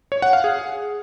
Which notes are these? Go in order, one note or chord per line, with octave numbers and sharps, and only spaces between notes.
C#5
F#5
F5
G#4